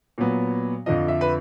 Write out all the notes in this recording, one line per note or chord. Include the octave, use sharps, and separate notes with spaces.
A#2 F#3 B3
F2 D3 F3 D#5
E5
B4